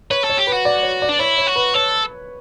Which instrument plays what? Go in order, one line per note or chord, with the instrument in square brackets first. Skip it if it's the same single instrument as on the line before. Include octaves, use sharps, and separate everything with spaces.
[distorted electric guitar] B4 [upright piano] C#5
[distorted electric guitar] A4
[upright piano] C#5
[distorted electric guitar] G4
[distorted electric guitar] F#4 [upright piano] B4
[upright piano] D5
C#5
D5
[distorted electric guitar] D4
[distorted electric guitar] E4 [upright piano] C#5
[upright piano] C#5
[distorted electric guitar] F#4
[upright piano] B4
[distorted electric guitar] A4 [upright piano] C#5